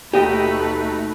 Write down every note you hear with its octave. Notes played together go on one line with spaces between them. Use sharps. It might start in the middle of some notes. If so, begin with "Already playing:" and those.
D#2 B2 A3 D#4 G4 B4 D#5 G5